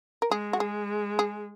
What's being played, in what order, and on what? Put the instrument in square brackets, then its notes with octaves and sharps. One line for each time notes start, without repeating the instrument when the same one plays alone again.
[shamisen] A#4
[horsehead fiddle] G#3 [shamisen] G#4
[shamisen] F#4
[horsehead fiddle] G#3 [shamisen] G#4
[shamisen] G#4